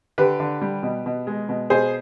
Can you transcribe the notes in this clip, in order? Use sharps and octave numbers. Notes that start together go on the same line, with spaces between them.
D3 G4 B4
D3
G3
B2
B2
G#3
B2
B2 G#4 C5